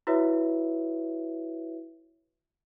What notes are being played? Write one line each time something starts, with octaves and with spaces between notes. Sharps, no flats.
E4 F#4 B4 C#5 E5